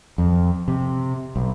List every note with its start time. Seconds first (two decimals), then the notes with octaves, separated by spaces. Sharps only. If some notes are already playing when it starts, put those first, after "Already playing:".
0.18 F2
0.68 C3
1.36 B1